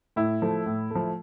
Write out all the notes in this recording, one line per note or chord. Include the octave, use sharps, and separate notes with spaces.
A2 E4
F3 A3
A2
F3 A3